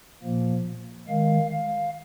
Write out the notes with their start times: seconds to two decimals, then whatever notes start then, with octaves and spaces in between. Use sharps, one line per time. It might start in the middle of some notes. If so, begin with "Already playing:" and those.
0.23 A#2 F3 A#3
1.08 D#3 G#3 F5
1.51 F5